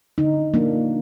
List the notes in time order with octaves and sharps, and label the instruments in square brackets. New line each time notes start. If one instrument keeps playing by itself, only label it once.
[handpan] D3 D#4
F3 A#3 D4